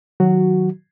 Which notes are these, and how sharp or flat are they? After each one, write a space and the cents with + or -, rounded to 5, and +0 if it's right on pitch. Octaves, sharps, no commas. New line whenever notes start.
D#3 +0 F#3 -10 F#4 +0